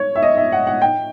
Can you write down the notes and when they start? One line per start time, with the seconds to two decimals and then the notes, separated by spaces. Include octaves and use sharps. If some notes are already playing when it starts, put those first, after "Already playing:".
Already playing: C#5
0.15 E5
0.22 D#5
0.37 E5
0.52 F#5
0.67 F#5
0.82 G5